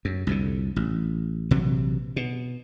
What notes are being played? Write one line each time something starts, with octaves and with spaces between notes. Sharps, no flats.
F#2
C2 F2 D3
A1
A#1 C3 E3 F#3
B2